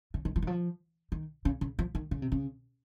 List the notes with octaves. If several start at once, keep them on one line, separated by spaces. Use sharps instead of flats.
C#3
D#3
F3
D#3
F3
D#3
C#3
C#3
F3
D#3
C#3
C3
C#3